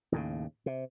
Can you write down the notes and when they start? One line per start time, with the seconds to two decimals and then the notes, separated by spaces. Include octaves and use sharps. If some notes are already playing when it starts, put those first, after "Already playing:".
0.12 D#2 A2 C#3
0.66 C3